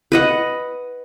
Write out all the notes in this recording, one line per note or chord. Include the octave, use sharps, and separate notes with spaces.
B4 D#5 F#5